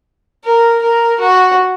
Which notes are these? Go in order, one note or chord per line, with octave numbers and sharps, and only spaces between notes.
A#4
A#4
F#4